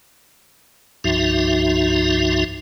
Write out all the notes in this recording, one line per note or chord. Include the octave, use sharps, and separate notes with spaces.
C2 G2 F3 D#4 F#4 E5